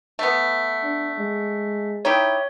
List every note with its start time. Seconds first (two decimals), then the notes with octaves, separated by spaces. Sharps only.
0.19 A3 B3
0.83 D4
1.19 G#3
2.05 D#4 E4 G4 C#5